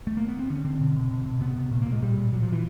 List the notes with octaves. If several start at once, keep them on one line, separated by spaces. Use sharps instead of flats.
A3
A#3
B3
C4
D3 C#4
D3 C4
B2
B2
B2
B2
C3 B3
C3
A#2 A#3
A#3
A#2
G#3
A#2 G3
A#2
A#2 F#3
F3
A#2
E3